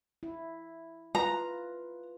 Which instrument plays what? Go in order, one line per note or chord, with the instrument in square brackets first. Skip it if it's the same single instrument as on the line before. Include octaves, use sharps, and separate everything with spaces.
[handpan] E4
[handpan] F4 B4 [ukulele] A#5